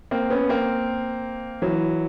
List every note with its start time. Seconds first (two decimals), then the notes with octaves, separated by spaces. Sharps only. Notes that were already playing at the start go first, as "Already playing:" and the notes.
0.11 A#3 C4
0.30 B3 C#4
0.49 A#3 C4
1.62 E3 F#3